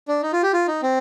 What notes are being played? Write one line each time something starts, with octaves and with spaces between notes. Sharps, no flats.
D4
D#4
F4
G4
F4
D#4
C4